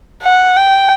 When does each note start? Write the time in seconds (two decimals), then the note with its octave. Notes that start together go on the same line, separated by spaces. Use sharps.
0.23 F#5
0.57 G5